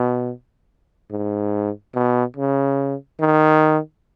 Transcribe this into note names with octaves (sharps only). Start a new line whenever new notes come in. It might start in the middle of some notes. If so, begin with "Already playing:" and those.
Already playing: B2
G#2
B2
C#3
D#3